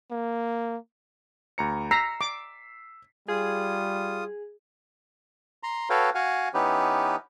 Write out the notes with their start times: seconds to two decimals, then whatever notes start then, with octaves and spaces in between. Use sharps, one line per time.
0.11 A#3
1.58 D2 A#5 C#7
1.91 A#5 E6 B6 C7
2.21 D6
3.28 G3 F4 G#4 D#6
5.63 A#5 C6
5.90 F#4 A4 B4 C#5 F5 G5
6.15 F#4 F5 F#5 G#5
6.54 E3 B3 C#4 D#4 G4 B4